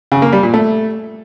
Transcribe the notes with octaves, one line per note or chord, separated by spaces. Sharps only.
C#3
A#3
G3
A#2
A3